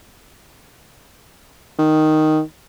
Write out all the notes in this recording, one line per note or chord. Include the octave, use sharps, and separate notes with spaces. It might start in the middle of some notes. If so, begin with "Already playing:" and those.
D#3